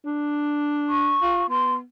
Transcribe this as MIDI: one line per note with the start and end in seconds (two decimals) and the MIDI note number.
0.05 1.17 62
0.89 1.47 85
1.22 1.44 65
1.50 1.83 59
1.50 1.75 84